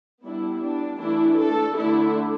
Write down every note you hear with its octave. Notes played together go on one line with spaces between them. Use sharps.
G3 B3 D4 E4
D4
E3 A3 D4 E4
A4
D3 A3 D4 E4